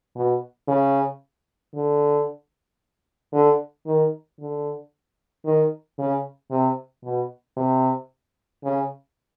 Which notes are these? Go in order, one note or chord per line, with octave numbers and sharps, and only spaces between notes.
B2
C#3
D3
D3
D#3
D3
D#3
C#3
C3
B2
C3
C#3